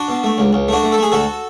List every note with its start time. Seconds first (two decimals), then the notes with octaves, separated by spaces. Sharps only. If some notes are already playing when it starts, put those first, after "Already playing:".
Already playing: D4 F#4
0.08 B2
0.24 A3
0.38 C#2
0.53 C#2
0.68 A3 D4 F#4
0.83 A3
0.92 A4
0.98 A3 G#4
1.12 D2 F#4 A4